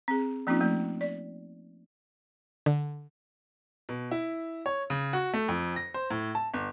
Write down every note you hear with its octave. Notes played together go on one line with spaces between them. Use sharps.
C4 G#4
F3 A#3 C4 C#4 D#4 F4
F3 A3
D5
D3
B2
E4
C#5
C#3
F#4
A3
F2
A#6
C5
A2
A5
G1